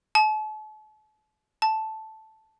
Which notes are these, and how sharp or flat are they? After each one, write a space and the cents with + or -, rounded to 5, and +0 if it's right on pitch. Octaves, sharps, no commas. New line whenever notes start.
A5 -40
A5 -5